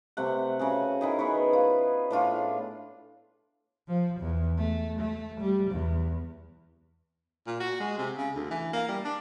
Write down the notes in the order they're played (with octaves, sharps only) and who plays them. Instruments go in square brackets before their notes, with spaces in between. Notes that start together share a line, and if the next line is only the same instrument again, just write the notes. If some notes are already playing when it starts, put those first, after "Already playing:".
[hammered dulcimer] C3 A3 F#5
C#3 F#4 G#4
D#3 E4 G#4
B3 G#4 B4 C#5
F4
A2 D4 F4 C#5
[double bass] F3
E2
A3
A3
G3
E2
[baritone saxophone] A#2
F#4
G#3
C3
C#3
D2
E3
A#3
G3
D4